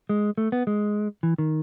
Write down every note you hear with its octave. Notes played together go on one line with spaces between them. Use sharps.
G#3
A3
B3
G#3
E3
D#3